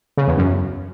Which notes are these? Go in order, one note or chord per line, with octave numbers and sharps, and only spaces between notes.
C#3
E2
F#2